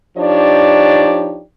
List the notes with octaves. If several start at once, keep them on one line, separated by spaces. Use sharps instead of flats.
F3 D4 D#4 G4 C#5 D5